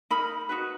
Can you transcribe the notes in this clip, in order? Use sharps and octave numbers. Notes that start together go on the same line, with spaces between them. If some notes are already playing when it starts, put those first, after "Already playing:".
D#4 A#4 B5
D#4 F#4 B4